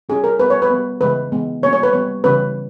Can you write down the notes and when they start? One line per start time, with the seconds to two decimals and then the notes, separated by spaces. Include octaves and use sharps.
0.09 G3 C#4 G#4
0.24 A#4
0.40 G3 B3 B4
0.50 C#5
0.62 B4
0.70 G3 B3
1.01 C#3 E3 G#3 B4
1.32 E3 G#3 B3
1.62 G3 A#3 C#4 C#5
1.73 C#5
1.83 B4
1.93 G3 B3 C#5
2.24 C#3 E3 G3 C#4 B4